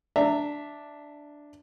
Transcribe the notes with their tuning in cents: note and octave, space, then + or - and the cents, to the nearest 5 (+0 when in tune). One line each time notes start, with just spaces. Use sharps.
D4 +0 E5 +0 A#5 -25